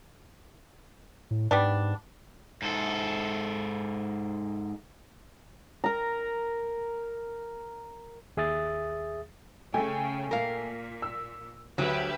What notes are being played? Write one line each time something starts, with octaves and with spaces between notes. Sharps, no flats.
A2
G#2 G3 B3 D4
G#2 A4
A#4 A#5
D#2 G#4 E5 D#6 A6
C#3 A3 G5 G#5
A#2 A#4 F5
E6
D2 F#3 G4 B4 E5